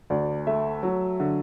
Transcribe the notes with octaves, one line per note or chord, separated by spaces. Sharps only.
D2 D5
A3 E5
F#3
D3